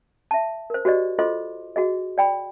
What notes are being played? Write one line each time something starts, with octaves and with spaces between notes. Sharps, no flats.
E5 A5
A#4 C5
F#4 G4 C5 D5 D#5
F4 A4 C5 D#5 C6 D6
F#4 G#4 D#5
D5 G5 B5